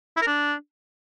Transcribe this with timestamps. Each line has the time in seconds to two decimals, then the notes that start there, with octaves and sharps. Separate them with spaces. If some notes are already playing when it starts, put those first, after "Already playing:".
0.17 E4
0.22 A#4
0.27 D4